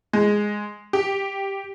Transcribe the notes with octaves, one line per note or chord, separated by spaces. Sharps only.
G#3
G4